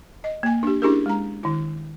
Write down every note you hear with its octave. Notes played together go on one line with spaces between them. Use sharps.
D#5
A#3 G#5
D4 G4
C#4 D4 E4 G4 G#4 A#4
G#3 A#5
D#3 E4